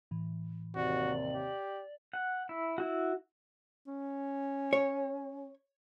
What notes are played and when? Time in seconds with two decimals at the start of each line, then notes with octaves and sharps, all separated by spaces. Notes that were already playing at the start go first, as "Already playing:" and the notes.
0.11 A2 E3
0.75 D#2 C3 F#4 D5
1.33 G4
2.13 F#5
2.49 E4
2.78 E4 F#4
3.87 C#4
4.73 C#5